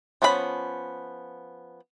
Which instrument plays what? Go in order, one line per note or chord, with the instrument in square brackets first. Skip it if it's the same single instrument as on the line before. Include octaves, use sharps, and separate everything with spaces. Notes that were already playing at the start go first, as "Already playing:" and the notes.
[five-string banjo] F3 B3 C#4 G#4 B5